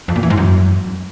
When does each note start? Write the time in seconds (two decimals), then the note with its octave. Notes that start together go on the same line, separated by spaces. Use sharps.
0.08 F2
0.16 A#2
0.23 E3
0.30 G#2
0.37 F#2